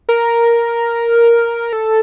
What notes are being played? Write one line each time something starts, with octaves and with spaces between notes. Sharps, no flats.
A#4
A4